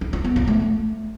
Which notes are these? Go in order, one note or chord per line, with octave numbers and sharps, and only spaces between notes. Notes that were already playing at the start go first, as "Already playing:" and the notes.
E4
F4
B3
F4
A3